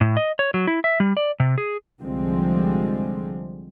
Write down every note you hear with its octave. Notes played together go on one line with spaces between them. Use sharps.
A2
D#5
C#5
F#3
E4
E5
G3
D5
C3
G#4
C2 D3 F3 G3 G#3 C4